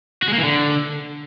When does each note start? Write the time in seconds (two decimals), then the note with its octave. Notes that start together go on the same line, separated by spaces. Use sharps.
0.22 F#4
0.28 G#3
0.33 A#3
0.38 E3
0.44 D3